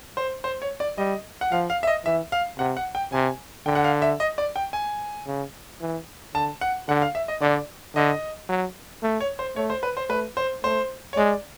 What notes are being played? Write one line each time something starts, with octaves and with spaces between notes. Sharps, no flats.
C5
C5
C#5
D5
G3 D#5
F#5
F3 F5
F5
E5
D#5
E3 E5
F5
C3 F#5
F#5
G5
C3 G#5
D3 G5
F#5
F5
E5
D#5
D5
G5
G#5
C#3
E3
D3 A5
F#5
D3 F#5
F5
E5
D#5
D3 D5
D3 D#5
F#3
A3
C#5
C5
A3 C#5
C5
B4
C5
A3 B4
C5
A3 C5
C#5
G#3 D5